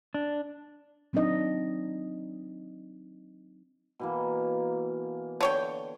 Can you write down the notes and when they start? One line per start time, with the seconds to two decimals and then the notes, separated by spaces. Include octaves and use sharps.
0.14 D4
1.13 F#3 C4 D4 D#4 D#5
3.99 B2 E3 A#3
5.41 D3 C#5 G5